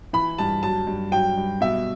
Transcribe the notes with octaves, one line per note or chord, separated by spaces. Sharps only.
E3 B5
G2 A5
F#3 A5
G2
F#3 G5
G2
B2 E5